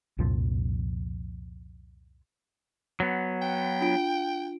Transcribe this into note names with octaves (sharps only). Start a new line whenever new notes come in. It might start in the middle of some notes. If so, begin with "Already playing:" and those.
C2 F2 A#2 F3
F#3 B3
G5
D4 F4 D7